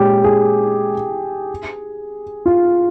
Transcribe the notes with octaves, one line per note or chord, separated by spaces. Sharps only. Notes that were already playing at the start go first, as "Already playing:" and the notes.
Already playing: A#2 G#3 C#4 G4
G#4
F4